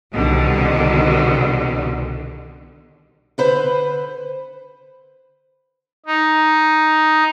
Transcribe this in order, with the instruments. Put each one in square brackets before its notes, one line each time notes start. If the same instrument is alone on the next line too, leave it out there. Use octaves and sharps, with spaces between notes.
[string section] C2 B2 D3 D#3
[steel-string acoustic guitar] D3 B4 C5
[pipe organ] D#4